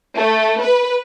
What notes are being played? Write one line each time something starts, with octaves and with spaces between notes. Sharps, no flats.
A3
B4